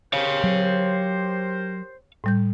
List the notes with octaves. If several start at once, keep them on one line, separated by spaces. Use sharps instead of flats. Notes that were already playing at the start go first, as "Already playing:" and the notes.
G4 A#4 C5 C#5 F5
F#3
A2 G3 G6